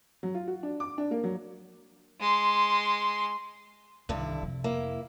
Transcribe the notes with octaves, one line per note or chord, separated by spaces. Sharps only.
F#3
F4
F#4
D4
D6
D4
A#3
F#3
G#3 C6
C2 G2 D3 D#3 E4
F2 C3
A#3 E4 E5